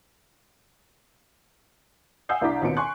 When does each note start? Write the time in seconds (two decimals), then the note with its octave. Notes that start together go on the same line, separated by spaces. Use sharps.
2.29 F#5 G#5 D#6 E6 G6 C7
2.41 C2 D4 E4 A#5 D6 B6
2.62 D#2 B2 C4 F4 C#7 D7
2.77 G#5 C6 C#6 F#6